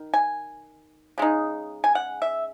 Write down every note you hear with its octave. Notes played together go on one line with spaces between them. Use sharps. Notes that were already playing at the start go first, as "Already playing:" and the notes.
Already playing: D#3
G#5
C#3 G#3 D#4
G#5
F#5
E5